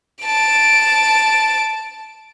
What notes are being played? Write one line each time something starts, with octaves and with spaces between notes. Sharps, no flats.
A5 D7